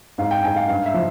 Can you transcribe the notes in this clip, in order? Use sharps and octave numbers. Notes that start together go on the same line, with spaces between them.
G#2 F5
G5
G#2 G#5
F5
G2 F5
E5
F3